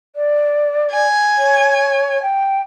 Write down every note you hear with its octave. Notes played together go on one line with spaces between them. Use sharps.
D5
G#5
C#5
G5